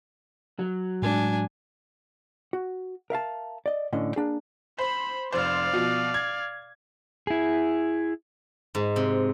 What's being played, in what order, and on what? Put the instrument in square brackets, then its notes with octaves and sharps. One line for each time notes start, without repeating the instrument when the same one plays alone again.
[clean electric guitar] F#3
[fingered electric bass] A2 G#3 [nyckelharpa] D4 G#5
[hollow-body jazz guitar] F#4
A#4 E5 F5 A5
D5 D#5
A2 D3 C#4 D#5
A#3 D4 G#4
[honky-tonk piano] C5 [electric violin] B5
[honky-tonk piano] F1 C5 [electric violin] D5 F5
[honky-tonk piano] B2 F3
G#6
[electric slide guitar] E4 G#4
[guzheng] G#2
C3